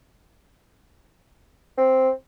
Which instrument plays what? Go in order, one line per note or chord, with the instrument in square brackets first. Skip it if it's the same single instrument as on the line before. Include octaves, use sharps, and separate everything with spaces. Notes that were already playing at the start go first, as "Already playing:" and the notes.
[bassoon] C4